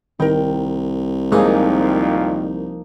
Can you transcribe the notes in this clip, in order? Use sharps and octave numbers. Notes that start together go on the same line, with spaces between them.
C2 D#3 A#4 G5
F2 A#2 D#3 F3 G#3 A#3 D#4 G#4